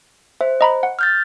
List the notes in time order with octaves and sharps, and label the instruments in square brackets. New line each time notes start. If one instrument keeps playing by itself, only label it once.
[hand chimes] C5 [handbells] E5
[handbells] D#5 A#5 B5
F#5
[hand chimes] F6 G6 A6